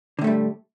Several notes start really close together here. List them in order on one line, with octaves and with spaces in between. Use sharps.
D3 A2 A3 G3